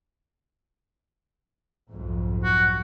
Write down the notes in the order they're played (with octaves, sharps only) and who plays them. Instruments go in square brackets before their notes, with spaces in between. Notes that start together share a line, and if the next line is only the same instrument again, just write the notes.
[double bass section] B1 F2 G#2
[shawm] F#4